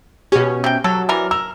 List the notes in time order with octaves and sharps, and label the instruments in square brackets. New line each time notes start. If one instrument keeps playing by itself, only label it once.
[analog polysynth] B2 C#4 [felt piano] G4
[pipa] C3 G5
[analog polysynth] F#3 [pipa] A4
[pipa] E3 D4 A#4
[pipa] A#4 [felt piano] E6